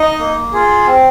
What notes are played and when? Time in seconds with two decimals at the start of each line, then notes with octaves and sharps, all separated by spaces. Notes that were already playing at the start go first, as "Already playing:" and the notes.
Already playing: D#4 D#5
0.19 A#3
0.53 F4 G#4
0.87 C4